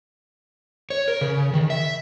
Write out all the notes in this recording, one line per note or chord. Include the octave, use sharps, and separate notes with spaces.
C#5
A#4
C#3
D#3
E5